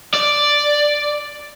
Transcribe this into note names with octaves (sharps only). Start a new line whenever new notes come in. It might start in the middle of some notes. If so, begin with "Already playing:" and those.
D5